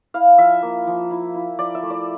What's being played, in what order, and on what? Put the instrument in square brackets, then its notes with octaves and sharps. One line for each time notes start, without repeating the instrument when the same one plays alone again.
[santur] E4 F5
F3 E5
A#3
F3
E4
E4
F3 D5
E5
A3
D5